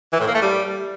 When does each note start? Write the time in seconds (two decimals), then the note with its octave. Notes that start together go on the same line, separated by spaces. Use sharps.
0.13 E3
0.20 A2
0.27 A#3
0.34 A3
0.42 G3